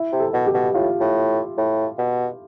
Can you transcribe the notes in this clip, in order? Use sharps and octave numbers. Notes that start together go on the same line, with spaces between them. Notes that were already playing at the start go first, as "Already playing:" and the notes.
Already playing: E4
C3
A4
B2
G4
B2
A2 F4
A2
A2
B2